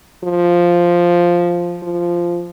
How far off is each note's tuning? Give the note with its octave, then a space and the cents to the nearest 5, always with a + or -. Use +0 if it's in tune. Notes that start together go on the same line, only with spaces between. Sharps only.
F3 +0
F3 -10